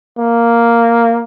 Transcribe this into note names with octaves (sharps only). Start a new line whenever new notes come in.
A#3